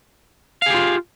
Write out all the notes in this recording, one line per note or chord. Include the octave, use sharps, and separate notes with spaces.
F4 G4 G#4 F5